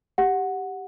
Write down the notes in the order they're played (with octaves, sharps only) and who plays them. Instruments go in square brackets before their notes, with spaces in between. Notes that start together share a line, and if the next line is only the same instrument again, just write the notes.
[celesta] G4 F#5